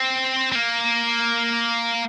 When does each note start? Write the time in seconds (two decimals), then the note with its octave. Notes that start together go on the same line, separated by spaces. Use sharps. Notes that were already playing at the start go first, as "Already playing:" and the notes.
Already playing: C4
0.52 C4
0.55 A#3